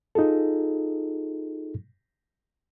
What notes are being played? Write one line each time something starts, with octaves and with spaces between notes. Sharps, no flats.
D#4 F4 G#4 A4